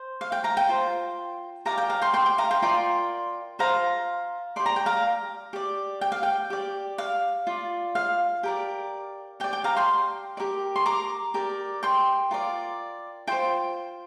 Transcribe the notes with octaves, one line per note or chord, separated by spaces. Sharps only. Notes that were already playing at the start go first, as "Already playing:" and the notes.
Already playing: C5
F5
G5
F5 A#5
G5
F4 C5
G4 A#4 D5 F5 A#5
G5
F5 A#5
G5 C6
G5 C6
G5
F5 A#5
G5 C6
F4 A#4 D5 G5 C6
F4 C5 F5 A#5
G4 D5 C6
A#5
G5
F5 A#5
G4 D5
G5
F5
G5
G4 D5
F5
F4 D5
F5
G4 A#4 D5
G4 D5 G5
G5
F5 A#5
G5 C6
G4 A#4 D5
C6
A#5 D6
G4 A#4 D5
G5 C6
F4 A#4 D5
F4 C5 G5 C6